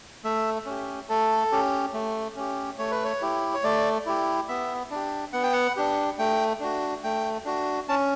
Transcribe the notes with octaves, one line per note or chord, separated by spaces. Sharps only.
A3 E5
C#4 G4
A3 A4
C#4 G4
A3
C#4 G4
A3 C#5
B4
C#5
E4 G4
C#5
A3 D5
E4 G4
B3 E5
D4 G4
B3 F#5
G5
F#5
D4 G4
A3 G5
D4 F#4
A3 G5
D4 F#4
C#4 A5